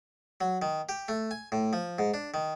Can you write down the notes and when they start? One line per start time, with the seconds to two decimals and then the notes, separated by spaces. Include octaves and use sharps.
0.41 F#3
0.62 D#3
0.89 G4
1.08 A3
1.31 G#5
1.52 A2
1.73 F3
1.99 G#2
2.14 D4
2.34 D#3